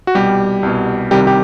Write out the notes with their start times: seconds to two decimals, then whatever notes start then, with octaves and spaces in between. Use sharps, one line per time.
0.07 F#4
0.15 C2 B2 G3 G4
0.63 C2 B2
1.11 C2 C3 D#3 G3 G4
1.27 G4